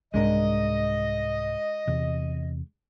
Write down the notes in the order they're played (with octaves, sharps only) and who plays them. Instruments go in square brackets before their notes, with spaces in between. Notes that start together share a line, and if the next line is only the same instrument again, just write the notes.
[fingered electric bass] C2 G#2 [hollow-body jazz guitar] G#3 D4 A#4 [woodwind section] D#5
[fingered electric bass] E2 C3